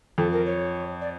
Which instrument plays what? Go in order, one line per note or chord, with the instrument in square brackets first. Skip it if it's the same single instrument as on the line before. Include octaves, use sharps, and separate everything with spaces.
[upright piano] F2 [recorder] A4
[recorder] A#4
C#5
D5